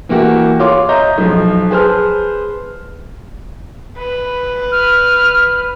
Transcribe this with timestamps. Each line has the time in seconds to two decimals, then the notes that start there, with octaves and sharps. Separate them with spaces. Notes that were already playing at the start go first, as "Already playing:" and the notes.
0.09 E3 A#3 E4 F#4 G4
0.59 F4 C#5 C6 D6
0.89 C#5 D#5 E5 A#5 G6
1.18 B1 F3
1.71 G#4 B4 C5 A5 F6
3.98 B4
4.72 F6